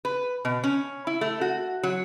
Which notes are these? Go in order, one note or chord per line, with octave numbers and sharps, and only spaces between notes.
B4
B2
C#4
E4
A3
F#4
F#3